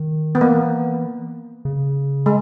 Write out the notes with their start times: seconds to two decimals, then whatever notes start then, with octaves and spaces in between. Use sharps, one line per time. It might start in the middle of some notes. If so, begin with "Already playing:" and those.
Already playing: D#3
0.35 B3
0.41 E3 A#3
1.65 C#3
2.26 G#3